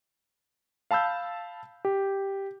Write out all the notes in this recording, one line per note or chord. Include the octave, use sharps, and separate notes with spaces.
F5 A5 B5 E6 G6
G4